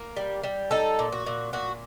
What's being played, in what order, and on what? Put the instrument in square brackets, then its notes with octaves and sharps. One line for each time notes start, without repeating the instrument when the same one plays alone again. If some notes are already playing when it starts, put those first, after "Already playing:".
Already playing: [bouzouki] A#3
G3
G3
D#4 A4
A#2
F#4
A#2
A#2 F#4